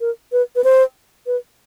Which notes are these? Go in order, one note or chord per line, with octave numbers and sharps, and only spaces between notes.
A#4
B4
B4
C5
B4